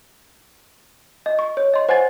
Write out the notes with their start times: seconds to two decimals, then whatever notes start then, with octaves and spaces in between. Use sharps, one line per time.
1.26 D#5
1.39 C#6
1.57 C#5
1.74 D#5 C6
1.89 C5 F#5 G#5 G#6 A6